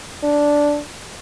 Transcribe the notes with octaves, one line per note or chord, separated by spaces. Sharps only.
D4